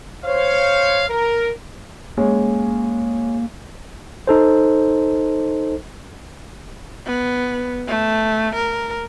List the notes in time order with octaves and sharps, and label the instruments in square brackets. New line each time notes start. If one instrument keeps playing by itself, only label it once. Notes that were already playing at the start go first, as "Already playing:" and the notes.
[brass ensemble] C5 C#5 F5
A#4
[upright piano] G#3 C#4 [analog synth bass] A#3
[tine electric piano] D#4 A4 C5
[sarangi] B3
A3
A#4